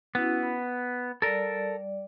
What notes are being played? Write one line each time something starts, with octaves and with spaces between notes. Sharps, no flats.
B3 C#4 E4 F#4
B5
G3 A4 A#4 D5